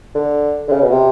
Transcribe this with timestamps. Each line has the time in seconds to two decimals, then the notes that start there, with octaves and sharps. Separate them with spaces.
0.15 D3
0.68 D3
0.72 C#3
0.81 B2
0.91 C3